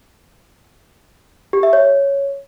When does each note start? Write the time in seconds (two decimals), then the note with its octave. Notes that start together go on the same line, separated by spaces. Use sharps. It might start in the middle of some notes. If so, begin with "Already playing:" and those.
1.53 G4
1.63 E5
1.73 C#5